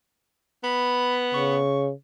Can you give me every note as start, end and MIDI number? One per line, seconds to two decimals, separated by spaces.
0.64 1.60 59
0.64 1.17 83
1.34 1.92 49
1.34 1.86 85